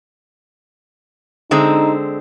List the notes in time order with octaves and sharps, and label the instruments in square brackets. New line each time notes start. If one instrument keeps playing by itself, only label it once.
[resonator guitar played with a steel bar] D3 G#3 C4 [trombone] D#4